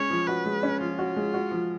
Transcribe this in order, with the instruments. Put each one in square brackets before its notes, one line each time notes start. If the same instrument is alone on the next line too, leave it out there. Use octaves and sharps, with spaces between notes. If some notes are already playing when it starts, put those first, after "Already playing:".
Already playing: [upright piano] G#3 C#4 [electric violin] C#5
[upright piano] F3
[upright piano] F#4 [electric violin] B4
[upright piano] G#3
C#4
[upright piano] F3 [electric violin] F4
[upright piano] F#4
G#3
F#4
F3